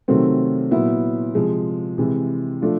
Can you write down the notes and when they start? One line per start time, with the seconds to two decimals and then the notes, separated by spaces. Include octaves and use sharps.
0.08 C3 D#3 F#3 A3 C4
0.71 A#2 F#3 B3 E4
1.35 C3 F3 G#3
1.98 C3 E3 G#3
2.61 F3 A3 D4 F4